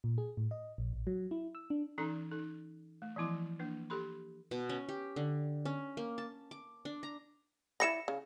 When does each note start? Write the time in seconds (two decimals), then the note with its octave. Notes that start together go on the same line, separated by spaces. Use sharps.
0.04 A#2
0.18 G#4
0.37 A2
0.51 D#5
0.78 A#1
0.93 A1
1.07 F#3
1.31 E4
1.55 E6
1.70 D4
1.98 E3 C#4 D#4 A4 D5 A#5
2.32 D#4 A4
3.02 A3
3.16 E3 F3 B3 E4 C6
3.59 A#3 D4 B4
3.90 G4 A4 B5 C6
4.51 B2
4.69 C#4
4.89 G4
5.16 D3
5.65 C#4
5.97 A#3
6.18 A5
6.51 D6
6.85 D4
7.03 A#5
7.80 E4 D5 B5 A#6 C#7 E7
8.08 C#3